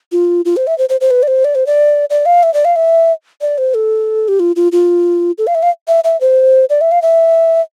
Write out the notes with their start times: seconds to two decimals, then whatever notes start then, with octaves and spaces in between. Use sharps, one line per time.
0.12 F4
0.45 F4
0.57 C5
0.67 E5
0.78 C5
0.89 C5
1.01 C5
1.11 B4
1.23 D5
1.28 C5
1.45 D5
1.55 C5
1.67 D5
2.10 D5
2.26 F5
2.43 E5
2.54 D5
2.65 F5
2.76 E5
3.41 D5
3.58 C5
3.74 A4
4.28 G4
4.40 F4
4.56 F4
4.72 F4
5.38 A4
5.47 F5
5.55 E5
5.63 F5
5.88 E5
6.04 E5
6.21 C5
6.70 D5
6.81 E5
6.92 F5
7.02 E5